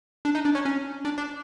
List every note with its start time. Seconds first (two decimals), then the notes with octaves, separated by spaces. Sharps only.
0.25 D4
0.35 D#4
0.45 D4
0.55 C#4
0.65 C#4
1.05 D4
1.18 D4